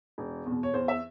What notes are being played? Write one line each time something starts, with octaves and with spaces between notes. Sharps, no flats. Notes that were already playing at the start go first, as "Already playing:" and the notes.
E1
E2 B2
C#5
E2 C5
E5